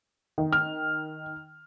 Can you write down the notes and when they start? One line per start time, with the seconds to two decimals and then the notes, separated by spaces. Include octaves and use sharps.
0.38 D#3
0.53 F6